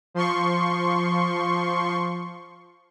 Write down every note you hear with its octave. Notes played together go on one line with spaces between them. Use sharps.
F3 C6 C#6